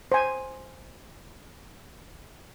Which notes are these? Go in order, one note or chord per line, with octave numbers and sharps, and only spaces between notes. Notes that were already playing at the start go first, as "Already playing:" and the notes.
C5 G#5